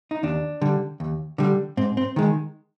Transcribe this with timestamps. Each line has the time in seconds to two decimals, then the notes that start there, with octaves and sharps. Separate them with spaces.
0.11 D#4
0.23 D#2 D4
0.61 D3 G3
1.00 D#2
1.38 D3 G3
1.77 G#2 C4
1.97 C4
2.16 D#3 G#3